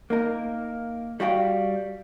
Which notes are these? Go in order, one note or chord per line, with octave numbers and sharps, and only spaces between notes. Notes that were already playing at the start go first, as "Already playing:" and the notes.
A#3 D#4 A#4
G3 F#4 F5 G5